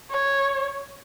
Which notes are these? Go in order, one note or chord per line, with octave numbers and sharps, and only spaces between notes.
C#5